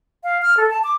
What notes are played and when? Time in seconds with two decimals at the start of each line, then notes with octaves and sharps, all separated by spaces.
0.24 F5
0.42 F6
0.57 A4
0.70 A5
0.84 D6